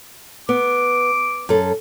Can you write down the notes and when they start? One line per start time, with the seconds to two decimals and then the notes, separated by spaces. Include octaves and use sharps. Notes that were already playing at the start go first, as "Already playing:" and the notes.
0.49 B3 D6
1.49 F#2 A4